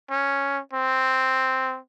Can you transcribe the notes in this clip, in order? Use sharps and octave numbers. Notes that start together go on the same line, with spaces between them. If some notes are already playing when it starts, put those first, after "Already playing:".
C#4
C4